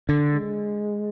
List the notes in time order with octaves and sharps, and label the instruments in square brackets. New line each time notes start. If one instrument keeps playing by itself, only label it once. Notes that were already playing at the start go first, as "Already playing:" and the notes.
[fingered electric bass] D3
[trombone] G#3